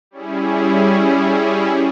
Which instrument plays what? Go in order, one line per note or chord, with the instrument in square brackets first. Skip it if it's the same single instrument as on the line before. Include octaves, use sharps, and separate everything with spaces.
[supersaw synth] G3 C#4 E4 G#4